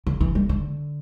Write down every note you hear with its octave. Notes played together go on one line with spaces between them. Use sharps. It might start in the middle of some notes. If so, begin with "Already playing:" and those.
D3
E3
G3
D3